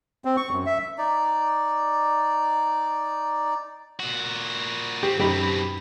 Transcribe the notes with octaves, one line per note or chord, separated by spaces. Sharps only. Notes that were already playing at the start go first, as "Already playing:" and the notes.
C4
C#6
F#2
E5
D#4 D5
A#2 F#4
G#2 C4 G4
F#2 B2 C4 D#4 G4 B5